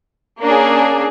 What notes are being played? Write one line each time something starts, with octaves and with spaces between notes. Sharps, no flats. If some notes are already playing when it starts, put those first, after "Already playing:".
A#3 C#4 D4 G#4